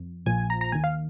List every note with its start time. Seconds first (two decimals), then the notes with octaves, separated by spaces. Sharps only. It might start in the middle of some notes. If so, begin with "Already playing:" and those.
Already playing: F2
0.26 A#1 A#2 F3 G#5
0.50 A#5
0.61 A#5
0.72 D#2 D#3 G#5
0.84 F5